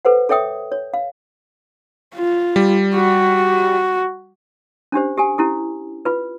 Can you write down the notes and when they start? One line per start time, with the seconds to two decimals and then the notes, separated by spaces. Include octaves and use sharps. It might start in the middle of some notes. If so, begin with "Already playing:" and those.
0.05 A4 B4 C5 F#5
0.29 A4 C#5 E5 G5 D#6
0.72 C#5
0.94 F5
2.15 F4
2.56 G3
2.95 F#4
4.92 C#4 D4 G4 C5
5.17 G4 A4 G#5
5.38 C#4 E4 G4 A4
6.05 F4 B4